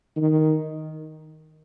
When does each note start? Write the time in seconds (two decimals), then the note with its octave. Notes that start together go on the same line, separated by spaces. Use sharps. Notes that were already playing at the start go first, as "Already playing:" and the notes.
0.17 D#3